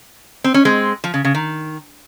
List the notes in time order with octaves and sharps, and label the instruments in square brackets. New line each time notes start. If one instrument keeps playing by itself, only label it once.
[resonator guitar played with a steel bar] C4
C#4
G#3 C4
F3
C#3
C#3
D#3